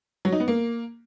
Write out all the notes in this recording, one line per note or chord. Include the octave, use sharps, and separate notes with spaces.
F#3
D#4
B3
A#3